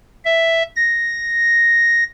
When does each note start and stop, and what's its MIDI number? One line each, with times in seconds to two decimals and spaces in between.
0.25 0.63 76
0.76 2.04 94